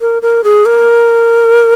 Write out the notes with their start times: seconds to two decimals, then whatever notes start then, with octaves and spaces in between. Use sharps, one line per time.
0.01 A#4
0.22 A#4
0.44 G#4
0.66 A#4